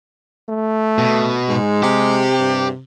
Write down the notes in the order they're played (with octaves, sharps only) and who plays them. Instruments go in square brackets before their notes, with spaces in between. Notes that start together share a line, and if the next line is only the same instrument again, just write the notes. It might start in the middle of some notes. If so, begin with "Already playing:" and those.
[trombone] A3
[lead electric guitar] B2
[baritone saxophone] G#2 [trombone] G#3
[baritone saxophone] C3 [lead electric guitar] G4
[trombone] G2